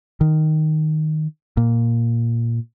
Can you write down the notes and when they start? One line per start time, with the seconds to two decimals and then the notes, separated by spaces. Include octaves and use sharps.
0.21 D#3
1.57 A#2